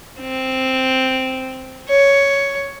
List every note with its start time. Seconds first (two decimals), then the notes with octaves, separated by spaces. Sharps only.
0.21 C4
1.89 C#5